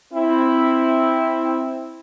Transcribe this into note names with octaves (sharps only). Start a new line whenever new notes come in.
C4 E4